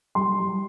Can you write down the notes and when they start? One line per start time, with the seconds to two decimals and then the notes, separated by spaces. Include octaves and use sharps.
0.15 G3 C6
0.39 G3